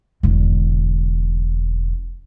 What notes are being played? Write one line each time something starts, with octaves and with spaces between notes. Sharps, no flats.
E1 D3